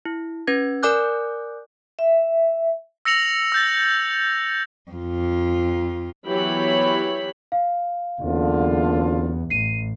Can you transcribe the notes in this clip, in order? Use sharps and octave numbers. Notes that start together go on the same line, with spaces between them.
E4
C#4 B4 G#6
A#4 D5 G#5 D6 F#6 G6
E5
E6 A#6 C#7 F7 F#7
E6 G6 A6
F2 F4
E3 F#3 B3 G4 C#5 B5
F5
F#1 E2 D3 F4
A1 C7 D#7